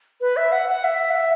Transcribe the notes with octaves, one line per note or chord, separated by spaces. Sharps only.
B4
E5
F#5
F#5
E5
F#5
E5